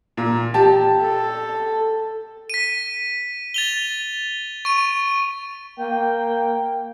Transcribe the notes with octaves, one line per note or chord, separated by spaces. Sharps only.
A#2
G4 A5
A4
B6 D#7
A6 F7 G7
C#6 D#7
A#3 G5